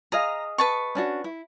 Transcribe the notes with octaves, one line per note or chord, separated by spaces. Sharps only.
G#4 D#5 F5 A#5
B4 A5 C#6
C#4 D4 F#4
E4